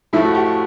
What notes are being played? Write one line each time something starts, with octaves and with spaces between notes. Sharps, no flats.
A2 F3 A3 E4
F#4
G4